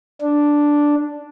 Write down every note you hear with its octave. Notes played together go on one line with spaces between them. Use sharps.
D4